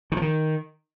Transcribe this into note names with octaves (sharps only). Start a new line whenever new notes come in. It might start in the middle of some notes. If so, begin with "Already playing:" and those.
D#3
F3
D#3